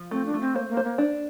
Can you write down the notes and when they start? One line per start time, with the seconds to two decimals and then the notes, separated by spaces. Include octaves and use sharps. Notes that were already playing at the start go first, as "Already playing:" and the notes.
Already playing: F3
0.11 A3 C4
0.26 D4
0.34 A3
0.41 C4
0.55 A#3 C5
0.69 A#3
0.77 C5
0.84 A#3
0.98 D4